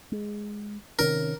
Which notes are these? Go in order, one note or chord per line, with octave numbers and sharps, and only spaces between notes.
G#3
C3 D#3 C#4 A#4